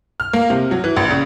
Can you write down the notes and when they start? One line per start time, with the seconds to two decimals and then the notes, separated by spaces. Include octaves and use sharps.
0.20 F6
0.33 A#3
0.50 C3
0.71 F#3
0.84 E3
0.97 A#1
1.11 C#3